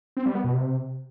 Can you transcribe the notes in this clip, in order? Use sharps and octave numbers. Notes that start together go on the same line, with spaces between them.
C4
G3
B3
B2
C3